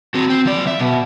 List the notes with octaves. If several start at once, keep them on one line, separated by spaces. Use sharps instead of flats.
C4 F#4
C4
F3 D5
E5
B2